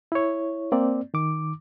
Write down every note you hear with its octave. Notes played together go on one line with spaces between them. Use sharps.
E4 C#5
A#3 C4 D5
D#3 D6